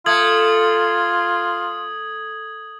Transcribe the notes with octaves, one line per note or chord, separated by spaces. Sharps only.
A3 F4 D#6 G#6 F#7